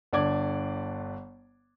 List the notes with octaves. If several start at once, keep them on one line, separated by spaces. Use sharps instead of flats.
G1 D3 D5 D6 G#6